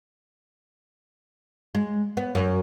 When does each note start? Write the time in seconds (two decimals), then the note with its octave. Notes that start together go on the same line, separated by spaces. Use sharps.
1.75 G#3
2.17 B3
2.35 F#2